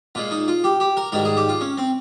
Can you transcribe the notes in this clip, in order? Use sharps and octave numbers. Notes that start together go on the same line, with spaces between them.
A#2 G#3 F4
D#4
F4
G4
G4
A#4
G#2 D#3 G3 A#4
G#4
G4
F4
C#4
C4